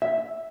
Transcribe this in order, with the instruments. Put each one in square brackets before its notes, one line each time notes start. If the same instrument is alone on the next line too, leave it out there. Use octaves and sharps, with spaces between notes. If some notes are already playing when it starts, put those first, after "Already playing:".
[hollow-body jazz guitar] E5